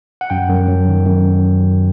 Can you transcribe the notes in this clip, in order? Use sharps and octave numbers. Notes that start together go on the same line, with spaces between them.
F#5
F#2 G5
F#2
F#3
D#3
F#2